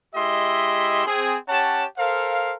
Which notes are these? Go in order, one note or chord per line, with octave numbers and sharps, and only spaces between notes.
G#3 E4 G4 D#5 E5 C6
C4 G#4
C#4 G4 C#5 F#5 A5
A4 A#4 C5 F5